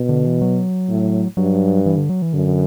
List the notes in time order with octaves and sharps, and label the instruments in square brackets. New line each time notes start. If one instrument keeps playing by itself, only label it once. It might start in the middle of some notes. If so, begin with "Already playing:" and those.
Already playing: [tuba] B2
[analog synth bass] D3
E3
F#3
[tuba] A2
[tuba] G2 [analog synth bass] F#3
[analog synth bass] E3
D3
F#3
E3
[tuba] F#2 [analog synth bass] D3